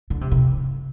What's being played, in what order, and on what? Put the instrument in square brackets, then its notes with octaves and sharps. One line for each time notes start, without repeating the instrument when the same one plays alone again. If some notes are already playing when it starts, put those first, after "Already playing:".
[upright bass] D3
C3
C3